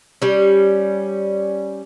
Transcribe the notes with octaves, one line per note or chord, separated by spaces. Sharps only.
G3 C#4